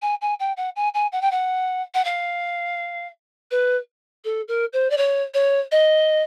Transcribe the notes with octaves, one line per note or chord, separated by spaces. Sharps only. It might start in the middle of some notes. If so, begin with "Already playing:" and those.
G#5
G#5
G5
F#5
G#5
G#5
F#5
G5
F#5
F#5
F5
B4
A4
A#4
C5
D5
C#5
C#5
D#5